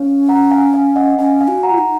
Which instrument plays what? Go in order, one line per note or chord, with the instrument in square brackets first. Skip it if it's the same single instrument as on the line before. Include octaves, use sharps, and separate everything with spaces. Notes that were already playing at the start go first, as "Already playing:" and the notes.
Already playing: [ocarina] C#4 [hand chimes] C#5 F5
[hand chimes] F#5 A#5
F5 G#5
F5 G#5
D#5 F#5
[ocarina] C#4 [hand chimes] F5 G#5
[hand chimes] F5 G#5
[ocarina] F#4
[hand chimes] F#5 A#5
[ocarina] F4
D#4